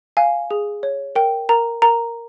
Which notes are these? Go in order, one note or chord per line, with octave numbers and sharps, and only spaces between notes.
F5 G#5
G#4
C#5
A#4 G5
A#4 A#5
A#4 A#5